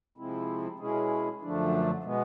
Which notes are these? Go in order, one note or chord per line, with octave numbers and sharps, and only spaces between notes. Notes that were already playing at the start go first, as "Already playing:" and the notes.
C3 F3 G#3 C4 E4
B2 G#3 C#4 E4 G#4
F#2 D3 F3 A3 D4
B2 G#3 B3